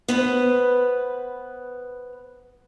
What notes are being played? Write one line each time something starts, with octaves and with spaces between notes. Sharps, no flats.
B3 B4 C5